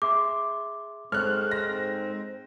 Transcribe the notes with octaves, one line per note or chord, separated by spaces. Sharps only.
G#4 E5 C6 D6
G#2 G#3 C4 A4 C#5 F6 F#6
A#6